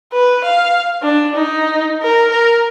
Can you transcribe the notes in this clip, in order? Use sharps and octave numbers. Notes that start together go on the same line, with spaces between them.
B4
F5
D4
D#4
A#4
A#4